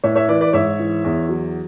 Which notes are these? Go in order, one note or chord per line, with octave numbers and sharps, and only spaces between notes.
A2 C#5 E5
C#5 E5
E3 B4 D5
B4 D5
G#2 C#5 E5
E3
E2
F#3